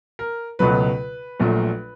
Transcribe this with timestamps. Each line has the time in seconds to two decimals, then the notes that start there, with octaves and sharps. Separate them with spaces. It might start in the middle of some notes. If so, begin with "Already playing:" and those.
0.19 A#4
0.59 C#2 B2 F#3 A3 B4
1.40 A#1 A#2 F#3 A3